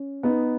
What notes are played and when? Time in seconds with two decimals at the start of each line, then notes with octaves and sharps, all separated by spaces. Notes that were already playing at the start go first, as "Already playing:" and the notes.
Already playing: C#4
0.23 B3 D#4